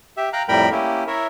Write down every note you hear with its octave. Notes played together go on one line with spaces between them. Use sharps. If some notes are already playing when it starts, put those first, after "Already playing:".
G4 E5
F5 G5 A#5 F#6
F2 A2 G3 A#4 G5 B5
A#3 C#4 E4 G4
E4 A#4 C#5 E5